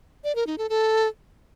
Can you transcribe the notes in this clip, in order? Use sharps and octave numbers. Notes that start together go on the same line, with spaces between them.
D5
A#4
D#4
A4
A4